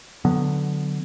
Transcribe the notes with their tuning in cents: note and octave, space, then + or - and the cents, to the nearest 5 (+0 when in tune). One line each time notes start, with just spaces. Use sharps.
D3 +0 F#3 -15 B3 +0